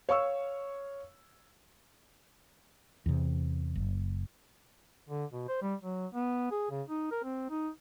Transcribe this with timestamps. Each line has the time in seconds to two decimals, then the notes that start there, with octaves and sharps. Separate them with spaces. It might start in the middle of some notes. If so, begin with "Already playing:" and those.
0.09 C#5 F5 C#6 E6
3.06 E2 C3
3.76 F#1
5.09 D3
5.32 B2
5.48 C5
5.62 G3
5.82 F#3
6.14 B3
6.51 G#4
6.70 C#3
6.87 D#4
7.11 A#4
7.24 C4
7.50 D#4